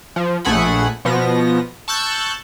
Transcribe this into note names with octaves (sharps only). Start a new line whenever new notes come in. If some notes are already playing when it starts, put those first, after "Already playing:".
F3
A#1 A3 G#4 F#5 B5
B2 F3 B3 A#6
A5 C#6 E6 F#6 G6 A6